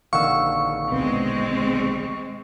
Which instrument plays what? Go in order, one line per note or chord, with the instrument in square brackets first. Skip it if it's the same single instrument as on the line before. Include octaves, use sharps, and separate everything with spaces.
[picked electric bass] A#1 D3 D#3 [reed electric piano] F5 F#5 E6 [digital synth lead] C#6
[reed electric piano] D2 B2 B3 [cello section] G#3 C4